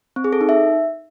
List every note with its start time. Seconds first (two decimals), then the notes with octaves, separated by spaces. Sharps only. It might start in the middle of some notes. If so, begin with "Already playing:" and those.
0.16 C4
0.24 G#4
0.33 A4
0.41 D#4
0.49 E5